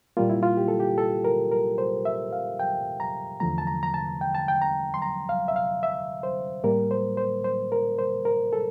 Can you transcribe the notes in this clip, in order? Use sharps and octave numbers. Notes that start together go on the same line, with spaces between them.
A#2 G3 A#3 F4
E4
F4
G4
A4
G4
A4
A#4
A#4
C5
E5
F5
G5
A#5
E2 D3 F3 A3 A#5
A5
A#5
A#5
A5
G5
A5
G5
A#5
C6
A#5
F5
E5
F5
E5
C5
A2 G3 A#3 A#4
C5
C5
C5
A#4
C5
A#4
A4